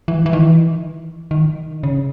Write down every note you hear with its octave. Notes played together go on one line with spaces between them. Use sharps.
E3
E3
D#3
E3
D#3
C#3